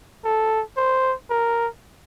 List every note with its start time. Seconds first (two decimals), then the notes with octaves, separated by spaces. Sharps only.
0.25 A4
0.77 C5
1.30 A#4